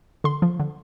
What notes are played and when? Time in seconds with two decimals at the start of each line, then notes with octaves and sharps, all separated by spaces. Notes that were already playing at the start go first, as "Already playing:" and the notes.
0.24 D3 C6
0.42 F3
0.60 D3